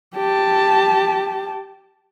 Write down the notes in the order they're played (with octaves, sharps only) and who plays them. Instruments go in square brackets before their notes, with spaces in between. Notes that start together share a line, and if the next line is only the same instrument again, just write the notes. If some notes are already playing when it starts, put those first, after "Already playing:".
[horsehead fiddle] G4 A5